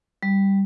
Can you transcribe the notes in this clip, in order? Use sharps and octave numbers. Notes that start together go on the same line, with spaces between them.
G3